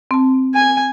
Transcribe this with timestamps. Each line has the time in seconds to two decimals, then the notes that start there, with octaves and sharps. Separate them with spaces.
0.11 C4 A5
0.55 G#5